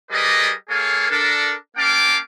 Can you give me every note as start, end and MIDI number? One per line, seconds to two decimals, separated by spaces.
0.11 0.51 55
0.11 0.51 68
0.11 0.51 70
0.11 0.51 71
0.11 0.51 74
0.11 0.51 75
0.69 1.06 58
0.69 1.06 68
0.69 1.06 69
0.69 1.06 73
0.69 1.06 77
0.69 1.06 80
1.10 1.53 62
1.10 1.53 69
1.10 1.53 70
1.77 2.17 58
1.77 2.17 61
1.77 2.17 77
1.77 2.17 79
1.77 2.17 81
1.77 2.17 86